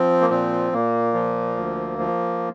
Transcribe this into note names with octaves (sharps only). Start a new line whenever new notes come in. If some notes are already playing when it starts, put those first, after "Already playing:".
Already playing: F3 C4
A#3
A#2 C4
A#2 A#3
F3
D2
F3